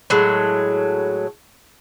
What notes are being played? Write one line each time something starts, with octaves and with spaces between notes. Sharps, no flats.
A2 F#3 G#3